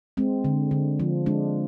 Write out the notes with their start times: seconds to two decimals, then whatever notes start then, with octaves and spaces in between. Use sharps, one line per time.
0.17 G#3 C4
0.44 D3
0.71 D3
1.00 F3
1.26 G#3 D4